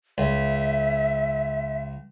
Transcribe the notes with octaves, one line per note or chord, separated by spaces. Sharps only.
C#2 E5